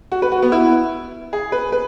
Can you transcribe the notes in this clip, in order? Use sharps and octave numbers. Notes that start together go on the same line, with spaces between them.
F#4
B4
F#4
B3
E4
G#4
B4
B4